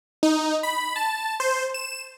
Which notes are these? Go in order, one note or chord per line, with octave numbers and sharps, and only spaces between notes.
D#4
B5
A5
C5
E7